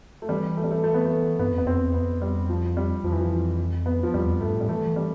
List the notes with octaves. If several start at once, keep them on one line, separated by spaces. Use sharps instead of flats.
A3
E3 G3
A3
G3
A3
A3
B3
A3
G2 B3
F2
B3
F2 C4
E2
F2 B3
G3
F3
G3
F2 F3
E3
F3
B3
F3
E2 G3
F2
G2 A3
A2
G3
E3 A3
E3
G3